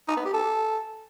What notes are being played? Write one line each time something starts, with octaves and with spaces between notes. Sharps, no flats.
D#4
B3
G4
A4